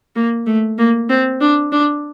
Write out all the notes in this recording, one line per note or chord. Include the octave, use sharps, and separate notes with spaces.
A#3
A3
A#3
C4
D4
D4